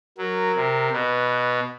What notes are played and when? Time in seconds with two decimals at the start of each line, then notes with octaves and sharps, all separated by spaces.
0.18 F#3 A#4
0.56 C3
0.93 B2 B4